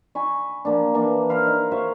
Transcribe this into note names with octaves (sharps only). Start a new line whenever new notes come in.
G#5 B5 C#6
F3 A#3 D4
E3 A#3 D4
A#4 C5 F5 B5
D#4
C5 C#5 E5 F5